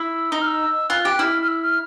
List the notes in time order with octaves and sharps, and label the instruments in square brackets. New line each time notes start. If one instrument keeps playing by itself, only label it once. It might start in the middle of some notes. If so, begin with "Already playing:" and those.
Already playing: [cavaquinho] E4 [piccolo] E6
[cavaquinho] D#4 [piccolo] D#6
[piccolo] F6
E6
[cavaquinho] F4 [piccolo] F#6
[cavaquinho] G4 [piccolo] F#6
[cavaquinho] E4 [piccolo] F6
[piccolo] F6
E6
F6